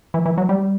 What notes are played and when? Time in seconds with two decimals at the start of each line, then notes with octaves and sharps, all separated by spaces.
0.14 E3
0.26 E3
0.38 F#3
0.49 G3